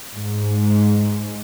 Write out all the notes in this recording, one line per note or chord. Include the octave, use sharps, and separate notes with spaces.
G#2